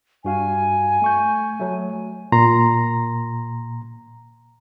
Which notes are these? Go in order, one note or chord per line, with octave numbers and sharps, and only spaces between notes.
G2 F#4 F5 G#5
A3 C#6 G6
F#3 A3
A#2 A#5 C6